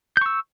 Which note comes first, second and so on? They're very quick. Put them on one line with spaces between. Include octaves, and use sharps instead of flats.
G6 C#6 E6